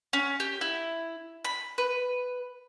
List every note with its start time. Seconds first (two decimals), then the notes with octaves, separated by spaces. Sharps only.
0.13 C#4
0.40 G4
0.61 E4
1.44 B5
1.78 B4